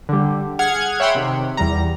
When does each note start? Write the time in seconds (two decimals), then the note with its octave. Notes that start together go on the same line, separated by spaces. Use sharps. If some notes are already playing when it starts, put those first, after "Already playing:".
0.09 D3 G3
0.59 G#4 F#5 F6 G#6
1.00 C#5 E5 F#5 G5 B5 C6
1.15 C3 D#3
1.57 E2 G3 A#5